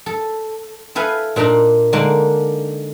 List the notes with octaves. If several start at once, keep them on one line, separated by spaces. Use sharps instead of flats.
A4
E4 A4 B4 F5 G#5
A#2 D4 D#4 A#5 C6
D3 G#3 A#3 D4 D#4